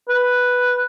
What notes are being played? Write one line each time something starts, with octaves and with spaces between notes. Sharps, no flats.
B4